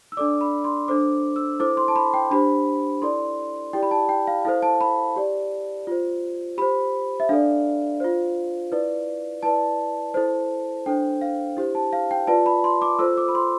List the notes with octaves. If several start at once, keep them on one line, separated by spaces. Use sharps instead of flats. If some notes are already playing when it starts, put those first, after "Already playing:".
E6
D4 A4 D5 D6
B5
C6
D4 A4 C5 D6
E6
E4 A4 C5 D6
C6
A5
B5
G5
D4 G4 C5 B5
E4 A4 D5 C6
E4 G4 D5 G5
B5
A5
G5
F5
E4 A4 C5 F5
A5
B5
G4 D5
F4 C5
G4 C5 B5
E5
D4 A4 D5 F5
F4 C5
E4 B4 D5
E4 B4 D5 A5
E4 A4 C5
D4 A4 C5 G5
F5
E4 G4 C5
A5
F5
G5
F4 B4 D5 A5
B5
C6
D6
F4 A4 C5 E6
D6
B5
C6